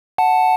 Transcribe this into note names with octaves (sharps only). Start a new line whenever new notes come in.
F#5 A5